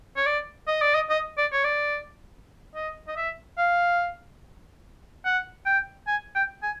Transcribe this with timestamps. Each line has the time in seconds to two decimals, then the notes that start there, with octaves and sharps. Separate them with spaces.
0.16 C#5
0.26 D5
0.68 D#5
0.82 D5
0.95 D#5
1.10 D#5
1.37 D5
1.52 C#5
1.64 D5
2.75 D#5
3.08 D#5
3.17 E5
3.58 F5
5.25 F#5
5.66 G5
6.07 G#5
6.35 G5
6.63 G#5